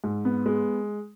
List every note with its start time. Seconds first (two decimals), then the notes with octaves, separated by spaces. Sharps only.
0.04 G#2
0.25 B3
0.46 G#3